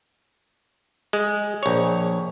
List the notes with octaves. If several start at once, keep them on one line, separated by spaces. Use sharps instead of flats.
G#3
A#1 C#5